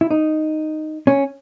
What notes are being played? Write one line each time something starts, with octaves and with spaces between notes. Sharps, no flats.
E4
D#4
C#4